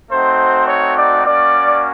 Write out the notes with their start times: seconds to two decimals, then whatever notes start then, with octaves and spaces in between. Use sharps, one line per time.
0.11 A3 C4 D#4 F#4 C5
0.68 C#5
0.96 D5
1.24 A#3 C#4 F#4 D5